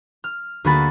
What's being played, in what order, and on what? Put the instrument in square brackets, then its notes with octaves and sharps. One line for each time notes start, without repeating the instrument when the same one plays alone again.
[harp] F6
D2 A#3 F#4 G#4 B5 A6